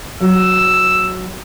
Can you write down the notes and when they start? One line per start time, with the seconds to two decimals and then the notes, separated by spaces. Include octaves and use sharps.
0.20 F#3 E6